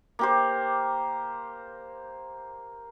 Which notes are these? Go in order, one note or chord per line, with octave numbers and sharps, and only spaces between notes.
A#3 G4 C5